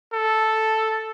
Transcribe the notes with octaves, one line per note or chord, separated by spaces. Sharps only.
A4